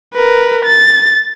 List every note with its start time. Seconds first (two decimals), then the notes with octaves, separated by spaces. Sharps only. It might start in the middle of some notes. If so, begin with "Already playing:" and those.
0.14 A#4 B4
0.65 A6